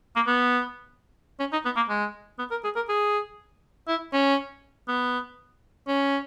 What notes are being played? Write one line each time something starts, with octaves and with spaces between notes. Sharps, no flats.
A#3
B3
C#4
D#4
B3
A#3
G#3
B3
A#4
G#4
A#4
G#4
E4
C#4
B3
C#4